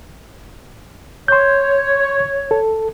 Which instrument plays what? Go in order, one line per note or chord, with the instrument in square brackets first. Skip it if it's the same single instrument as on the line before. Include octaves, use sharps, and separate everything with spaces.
[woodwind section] C#5 [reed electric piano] C6 G6
[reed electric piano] A4